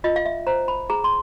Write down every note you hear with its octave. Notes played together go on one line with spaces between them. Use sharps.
F4 D#5
F5
E5
C5 A#5
B5
G#4 A#5
C6